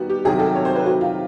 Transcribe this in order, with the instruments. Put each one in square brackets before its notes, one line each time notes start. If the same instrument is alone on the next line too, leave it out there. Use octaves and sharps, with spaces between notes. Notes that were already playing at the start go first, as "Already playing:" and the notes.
Already playing: [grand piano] D#3 G3 B3 [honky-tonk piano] F#4
[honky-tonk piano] G4
[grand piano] C3 D#3 F#3 [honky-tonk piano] G#4
[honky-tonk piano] A4
C#5
C5
B4
F#4
F4